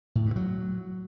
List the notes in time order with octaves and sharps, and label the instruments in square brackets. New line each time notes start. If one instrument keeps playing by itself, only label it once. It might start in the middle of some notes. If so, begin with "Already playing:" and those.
[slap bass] A2
G2
F#3